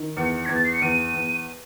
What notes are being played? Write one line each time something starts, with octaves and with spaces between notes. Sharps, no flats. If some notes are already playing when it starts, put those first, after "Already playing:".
Already playing: D#3
E2 C#7
E2 G#6
A6
C7
C#7
E2 D#7
E2